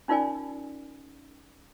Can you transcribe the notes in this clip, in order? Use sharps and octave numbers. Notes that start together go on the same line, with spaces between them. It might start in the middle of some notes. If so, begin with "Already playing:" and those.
C#4 D#4 F4 A#4 D5 G#5